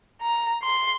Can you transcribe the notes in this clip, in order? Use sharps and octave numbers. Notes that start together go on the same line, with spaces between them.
A#5
C6